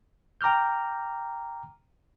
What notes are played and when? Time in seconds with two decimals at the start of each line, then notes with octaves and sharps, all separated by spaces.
0.41 G5 A#5 D6 F6 G6